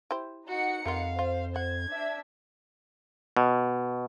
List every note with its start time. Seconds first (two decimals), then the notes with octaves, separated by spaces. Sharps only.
0.11 E4 G4 C5
0.48 D#4 F#4 F#5 C#7
0.85 F2 G3 A#3 F4 F5
1.19 F4 C5
1.56 F#5 G#6
1.91 D4 E5
3.37 B2